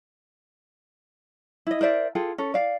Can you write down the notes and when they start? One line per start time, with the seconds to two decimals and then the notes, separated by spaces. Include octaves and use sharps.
1.67 E4 D#5
1.81 A#4 C5 D5 E5
2.15 F4 G#4 A4 G5
2.38 C#4 A4
2.54 D5 F5